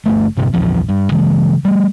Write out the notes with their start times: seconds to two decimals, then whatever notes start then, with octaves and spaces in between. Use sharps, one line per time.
0.06 G1 A3
0.37 A#1 G2 C3
0.53 A#1 E2 F3
0.89 G2
1.11 C#3 E3 G#3
1.65 G3 A3